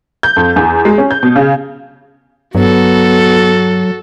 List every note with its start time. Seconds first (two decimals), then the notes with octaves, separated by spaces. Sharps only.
0.23 G6
0.36 F2
0.56 E2
0.85 G#3
0.98 C#4
1.11 G6
1.23 B2
1.36 C#3
2.55 G2 F#3 B3 F#4 A4